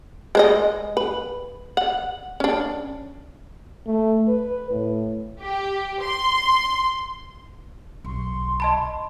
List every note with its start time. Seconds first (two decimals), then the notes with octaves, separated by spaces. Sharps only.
0.35 G#3 C5 D#5
0.97 B4
1.77 F#5
2.40 C#4 D4
3.87 A3
4.28 B4
4.70 A2
5.41 G4
6.03 C6
8.05 B1 C6 C#6
8.60 D#5 A5 B5